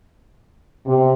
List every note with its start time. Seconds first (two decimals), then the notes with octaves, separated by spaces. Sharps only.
0.87 C3